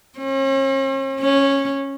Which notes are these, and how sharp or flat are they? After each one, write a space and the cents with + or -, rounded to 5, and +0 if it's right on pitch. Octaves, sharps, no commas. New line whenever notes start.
C#4 -45
C#4 -10